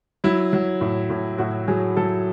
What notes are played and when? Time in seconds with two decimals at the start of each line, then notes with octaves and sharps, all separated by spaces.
0.24 F#3 E4
0.53 F#3
0.81 A2
1.10 A2
1.38 A2 F#4
1.68 F#3 G#4
1.97 F#3 A4